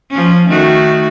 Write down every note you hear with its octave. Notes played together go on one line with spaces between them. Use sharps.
F3 C#4
D#3 A3 F#4